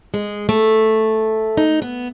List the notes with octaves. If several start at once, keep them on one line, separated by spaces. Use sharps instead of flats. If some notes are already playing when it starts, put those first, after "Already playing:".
G#3
A3
D#4
B3